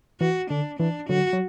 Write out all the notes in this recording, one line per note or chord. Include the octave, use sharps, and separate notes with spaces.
E3 F#4
D3 D4
E3 D4
D3 F#3 F#4
F#3